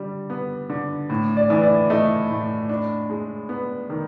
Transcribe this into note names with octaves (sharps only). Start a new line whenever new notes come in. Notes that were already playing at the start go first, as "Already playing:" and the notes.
Already playing: D3 G3
B3
D3
A2
D5
E3
D5
A3 D#5
A2
D4
G#3
B3
D#3